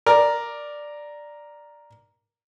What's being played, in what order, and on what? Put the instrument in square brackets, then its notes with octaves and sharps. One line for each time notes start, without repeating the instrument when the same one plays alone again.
[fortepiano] A#4 D5